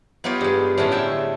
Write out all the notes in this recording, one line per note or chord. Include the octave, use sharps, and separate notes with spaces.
B3 D#4 F4 G4 C#5
G2 G#3
A2 D3 G#3 A3 C#4
E5 G5 A5 C6